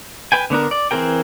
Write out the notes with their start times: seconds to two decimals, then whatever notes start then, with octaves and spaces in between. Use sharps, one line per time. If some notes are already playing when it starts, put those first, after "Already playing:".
0.32 B4 G5 G#5
0.50 D3 B3 D4 A#4
0.71 D5
0.91 E3 C4 G#4 A#4 G5